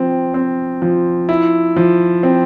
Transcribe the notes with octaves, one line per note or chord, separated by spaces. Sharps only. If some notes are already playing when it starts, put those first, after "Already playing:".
Already playing: F3 C4
C4
F3
E4
F3
C4